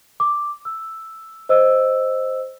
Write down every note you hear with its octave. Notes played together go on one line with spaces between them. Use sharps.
D6
E6
C5 D#5 E6